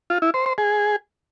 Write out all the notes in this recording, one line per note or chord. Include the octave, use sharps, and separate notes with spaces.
F4
E4
C5
C5
G#4